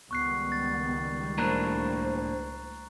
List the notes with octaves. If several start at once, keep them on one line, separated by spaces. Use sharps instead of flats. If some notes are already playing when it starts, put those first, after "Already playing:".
C#2 D#3 G3 B3 C#6 F#6 C7
A6
A2 A#3 D4 C5 A#5 F#6